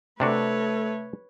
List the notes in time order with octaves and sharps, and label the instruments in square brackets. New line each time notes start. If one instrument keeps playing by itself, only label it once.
[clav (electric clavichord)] C3 D4 F#4 [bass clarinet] A3 [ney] A4 [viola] B4 C#5